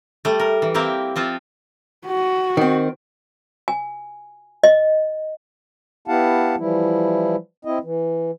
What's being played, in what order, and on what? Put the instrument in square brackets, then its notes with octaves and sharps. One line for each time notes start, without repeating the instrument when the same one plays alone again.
[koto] G3 A3
A#4
E3
A#3 C4 E4 G4 A#4
F3 C4 F4 A5
[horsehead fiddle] F#4
[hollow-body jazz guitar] D#3 C4
[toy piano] G#5
D#5
[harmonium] B3 E4 G4 F5 F#5 A5
E3 F3 G3 E4
C4 E4 D#5
E3